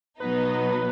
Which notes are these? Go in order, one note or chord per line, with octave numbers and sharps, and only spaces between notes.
B2 F#3 B3 D#4 B4